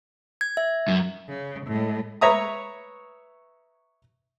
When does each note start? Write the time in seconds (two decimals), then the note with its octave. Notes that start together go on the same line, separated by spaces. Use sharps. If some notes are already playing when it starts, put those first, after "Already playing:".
0.41 G#6
0.57 E5
0.88 F#2
1.28 C#3
1.67 A2 G#3
2.21 B4 C#5 E5 A#5 D#6